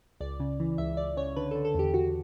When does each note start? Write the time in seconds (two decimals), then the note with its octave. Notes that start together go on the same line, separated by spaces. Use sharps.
0.20 C#2 D5
0.40 C#3
0.60 E3
0.78 C#2 E5
0.97 C#2 D5
1.17 C#3 C#5
1.36 D3 B4
1.51 D3 A4
1.65 A4
1.74 E2 G4
1.93 E2 F#4